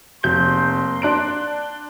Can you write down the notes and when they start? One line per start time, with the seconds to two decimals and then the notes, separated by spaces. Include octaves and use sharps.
0.24 F1 A#3 A#5 C6 G6
1.02 D4 F#6 D7